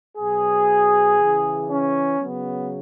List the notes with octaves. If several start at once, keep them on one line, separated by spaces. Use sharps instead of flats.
B2 F#3 G#4
C#3 E3
C#4
C#3 F#3 B3